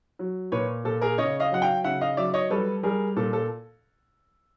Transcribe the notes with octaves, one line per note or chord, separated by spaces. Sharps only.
F#3
A#2 B4 C#5
A#2 A4
G#4 A#4
C#3 C#5 D#5
D#5 F5
F#3 F#5
F5 G5
C#3 E5 F#5
D#5 F5
F#3 D5 E5
C#5 D#5
G3 A4 B4
G3 G#4 A#4
A#2 A4
A4